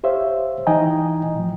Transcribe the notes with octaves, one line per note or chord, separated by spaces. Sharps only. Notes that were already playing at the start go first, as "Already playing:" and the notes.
G4 C5 C#5 E5 F5
E3 D#4 D#5 G5 G#5 A#5
A2 F3